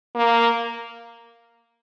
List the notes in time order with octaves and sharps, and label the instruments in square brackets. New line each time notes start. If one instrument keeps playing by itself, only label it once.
[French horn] A#3